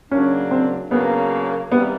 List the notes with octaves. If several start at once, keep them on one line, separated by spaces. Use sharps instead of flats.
C#3 F#3 A#3 C#4 D4
C4
C#3 F#3 A#3 B3 D4
C3 D#3 G3 A#3 B3